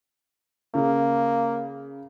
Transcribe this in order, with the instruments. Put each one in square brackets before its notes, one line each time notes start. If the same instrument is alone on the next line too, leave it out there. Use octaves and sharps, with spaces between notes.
[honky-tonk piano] C#3 [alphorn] A#3